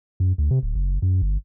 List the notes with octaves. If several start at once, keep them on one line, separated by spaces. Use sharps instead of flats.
F#2
D2
C3
D1
F#1
F#2
G1